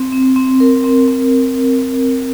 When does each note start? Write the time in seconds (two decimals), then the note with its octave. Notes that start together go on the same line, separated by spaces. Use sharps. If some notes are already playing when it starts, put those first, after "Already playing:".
Already playing: C4
0.12 C4
0.36 C4
0.60 A#4
0.84 C4
1.08 C4